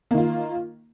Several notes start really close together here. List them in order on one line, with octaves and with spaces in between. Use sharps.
A#3 D#3 F4